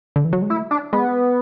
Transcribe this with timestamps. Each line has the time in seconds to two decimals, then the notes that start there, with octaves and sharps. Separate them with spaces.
0.16 D3
0.25 E3
0.33 F#3
0.42 G#3
0.50 A3 E4
0.71 D4
0.93 G#3 B3